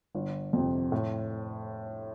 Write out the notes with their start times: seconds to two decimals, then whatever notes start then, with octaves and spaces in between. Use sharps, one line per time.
0.15 G1
0.53 F2 C3
0.92 A2